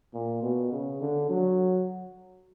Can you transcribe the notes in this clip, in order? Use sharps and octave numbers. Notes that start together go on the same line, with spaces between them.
A#2
B2
C#3
D3
F#3